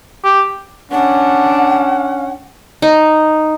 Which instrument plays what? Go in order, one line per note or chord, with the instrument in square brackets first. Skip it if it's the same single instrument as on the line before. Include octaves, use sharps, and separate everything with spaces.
[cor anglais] G4
[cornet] C#4 [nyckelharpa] D4 [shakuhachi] F#5
[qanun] D#4